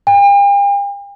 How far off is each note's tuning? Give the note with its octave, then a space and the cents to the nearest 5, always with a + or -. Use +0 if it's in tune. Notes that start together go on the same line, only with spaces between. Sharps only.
G5 +45